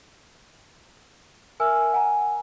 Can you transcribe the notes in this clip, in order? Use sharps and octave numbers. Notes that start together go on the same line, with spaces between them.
A#4 E5 G#5 E6 F6
F#5 G#5 A#5